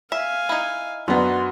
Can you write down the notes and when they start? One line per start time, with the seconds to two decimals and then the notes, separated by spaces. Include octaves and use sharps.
0.12 E5 F5 G#5
0.49 D#4 E4
1.08 F#2 B3 D4 F#4 C6